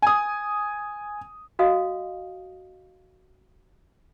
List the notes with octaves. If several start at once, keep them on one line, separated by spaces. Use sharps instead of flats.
G#5 D#6
F#4 D#5 F5 D#6